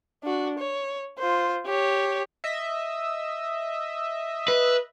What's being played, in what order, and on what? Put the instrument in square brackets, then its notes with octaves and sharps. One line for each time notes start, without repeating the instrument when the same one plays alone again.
[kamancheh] D4 F#4
C#5
F4 C5
G4 C#5
[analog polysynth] D#5 E5
[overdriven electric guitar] B4